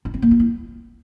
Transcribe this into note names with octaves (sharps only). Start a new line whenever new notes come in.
D4
C4
A#3
F4
E4